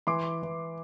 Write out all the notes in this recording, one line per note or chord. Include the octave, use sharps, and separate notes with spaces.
E3 C6 D6
E3